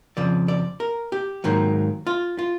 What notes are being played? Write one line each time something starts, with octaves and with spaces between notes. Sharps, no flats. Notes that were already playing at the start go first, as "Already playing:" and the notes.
F2 C#3 F3 D5
D5
A#4
G4
G#2 D#3 F#3 A#3
F4
F4